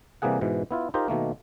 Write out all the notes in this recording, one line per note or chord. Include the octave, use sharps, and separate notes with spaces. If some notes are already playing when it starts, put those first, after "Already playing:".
C3 E3 G3 A#3 G#4 F#5
G#2 B2 E3
B3 E4 F4
D#4 F4 G4 A#4 C5
B2 D#3 A3 A#3